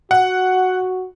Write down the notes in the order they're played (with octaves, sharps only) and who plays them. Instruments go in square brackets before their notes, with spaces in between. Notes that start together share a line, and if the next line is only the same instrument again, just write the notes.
[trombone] F#4 [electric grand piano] F#5